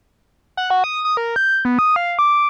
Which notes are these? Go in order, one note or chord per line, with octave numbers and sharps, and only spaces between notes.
F#5
F#4
D#6
D#6
A#4
G6
B3
D#6
F5
D6
D6